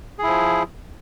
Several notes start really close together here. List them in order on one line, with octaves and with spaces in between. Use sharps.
G#4 E4 F3